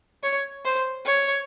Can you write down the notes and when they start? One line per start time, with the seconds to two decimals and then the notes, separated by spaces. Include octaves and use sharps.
0.23 C#5
0.65 C5
1.06 C#5